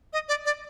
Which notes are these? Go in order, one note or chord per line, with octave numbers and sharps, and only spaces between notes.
D#5
D5
D5